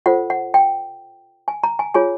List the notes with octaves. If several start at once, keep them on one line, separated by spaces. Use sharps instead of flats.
F4 A4 C5 F#5
F#5
G5
G#5
A#5
G#5
F4 G#4 C#5 G#5